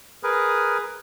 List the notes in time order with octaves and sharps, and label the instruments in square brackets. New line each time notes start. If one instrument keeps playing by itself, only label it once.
[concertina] G#4 A#4 B4